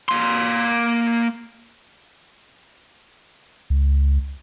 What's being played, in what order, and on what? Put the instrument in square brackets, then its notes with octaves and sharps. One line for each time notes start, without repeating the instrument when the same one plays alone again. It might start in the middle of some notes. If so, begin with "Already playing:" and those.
[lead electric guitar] A#3 C6
[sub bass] C#2